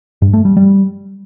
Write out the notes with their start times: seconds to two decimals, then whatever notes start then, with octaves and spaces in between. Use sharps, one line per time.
0.22 G2
0.33 A3
0.45 G3
0.57 G3